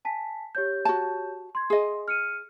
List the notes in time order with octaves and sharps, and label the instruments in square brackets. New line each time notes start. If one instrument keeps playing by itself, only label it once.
[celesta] G#5 A5 B6
G4 C#5 G6
[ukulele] F#4 A5
[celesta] C6 G#6
[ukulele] G#4 D#5 [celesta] C6
[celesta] F6 C#7 D#7